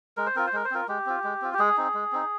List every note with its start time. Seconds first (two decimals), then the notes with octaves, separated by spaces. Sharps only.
0.17 G#3 A#4
0.26 C5
0.36 C4 F4 A#4
0.47 C5
0.53 G#3 A#4
0.65 C5
0.71 C4 F4 A#4
0.88 G#3 G4
1.06 C4 F4
1.24 G#3
1.42 C4 F4
1.53 G4
1.59 G#3 G#4
1.77 C4 D#4
1.94 G#3
2.12 C4 D#4